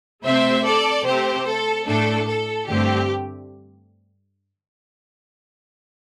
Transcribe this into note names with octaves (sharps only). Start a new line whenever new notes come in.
C3 A3 C4 C5 E5
A4 D5
C3 A3 C4 G4 C5
A4
A2 A3 D4 A4
A4
G2 D3 A3 C4 G4